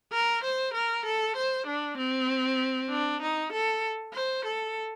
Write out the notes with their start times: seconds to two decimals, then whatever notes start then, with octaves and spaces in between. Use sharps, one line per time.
0.12 A#4
0.44 C5
0.74 A#4
1.05 A4
1.36 C5
1.67 D4
1.98 C4
2.90 D4
3.22 D#4
3.52 A4
4.13 C5
4.45 A4